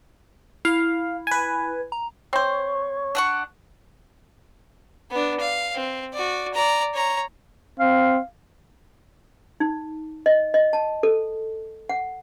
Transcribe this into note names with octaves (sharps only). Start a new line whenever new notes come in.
E4 F5
B4 G#5
A#5
C4 C5 C#5
D4 F#5 C#6
B3 D4
F5
C4
F#4 D5
D5 A#5
C#5 A#5
C4 F5
D#4
D#5
D#5
A5
A4
F#5